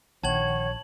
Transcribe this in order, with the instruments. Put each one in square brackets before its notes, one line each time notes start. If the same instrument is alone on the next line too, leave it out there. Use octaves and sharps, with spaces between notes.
[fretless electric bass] A#1 [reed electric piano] D#3 F#5 G5 [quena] C#5 [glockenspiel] A5 G#6 F#7